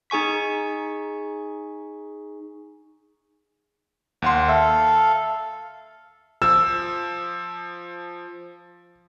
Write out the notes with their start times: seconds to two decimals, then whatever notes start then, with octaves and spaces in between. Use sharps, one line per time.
0.10 D#4 G#4 G#5 C#6 B6
4.22 D#2 F#5 C6
4.48 A4 E5 F5
6.42 F3 E6